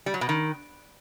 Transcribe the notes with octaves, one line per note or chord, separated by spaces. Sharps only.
G3
F#3
B2
D#3